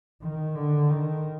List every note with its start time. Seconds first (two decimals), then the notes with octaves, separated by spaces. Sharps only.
0.22 D#3
0.55 D3
0.90 D#3